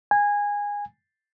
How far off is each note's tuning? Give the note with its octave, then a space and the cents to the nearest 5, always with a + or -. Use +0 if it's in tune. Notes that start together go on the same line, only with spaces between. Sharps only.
G#5 -15